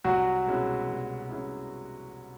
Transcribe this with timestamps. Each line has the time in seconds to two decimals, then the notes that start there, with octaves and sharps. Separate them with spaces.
0.04 C2 F#3 F#4
0.46 B2 G#3 C#4 E4
0.88 C2
1.29 B2 G#3 C#4 E4